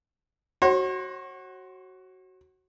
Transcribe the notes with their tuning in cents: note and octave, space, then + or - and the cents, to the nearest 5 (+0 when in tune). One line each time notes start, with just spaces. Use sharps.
F#4 +15 C#5 -45 C6 +0